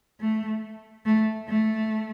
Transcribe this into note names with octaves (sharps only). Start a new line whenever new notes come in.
A3
A3
A3